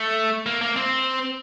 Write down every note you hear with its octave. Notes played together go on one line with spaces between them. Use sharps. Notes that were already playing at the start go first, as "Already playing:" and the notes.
Already playing: A3
A#3
A#3
C4